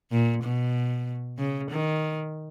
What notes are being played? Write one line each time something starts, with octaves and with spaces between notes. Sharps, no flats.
A#2
B2
C#3
D#3